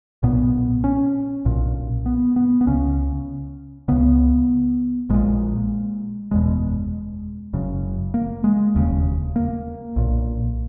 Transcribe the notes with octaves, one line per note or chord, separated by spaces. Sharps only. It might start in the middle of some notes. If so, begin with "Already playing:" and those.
B1 A#2 B3
C#4
B1 A#2
B3
B3
B3
C#2 C#3 C#4
C#2 C#3 B3
A#1 A#2 G#3
F#1 E2 B2 G#3
F#1 F#2 C#3
A#3
G#3
E1 D#2 C#3
A#3
B1 A#2